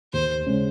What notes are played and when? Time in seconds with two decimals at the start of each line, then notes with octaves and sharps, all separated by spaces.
0.13 D#2 C5
0.46 C#3 G#3 C#4